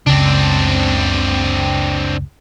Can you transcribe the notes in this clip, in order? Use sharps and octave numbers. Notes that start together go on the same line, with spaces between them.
F#1 C#2 C#3 C4 D4